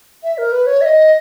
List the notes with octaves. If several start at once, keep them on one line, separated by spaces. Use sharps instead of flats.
E5
A#4
B4
C#5
E5
D#5